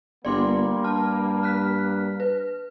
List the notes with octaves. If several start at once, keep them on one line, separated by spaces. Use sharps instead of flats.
G1 G3 A#3 D5 C6 D6
G2 A5 F6
F6 F#6 B6
B4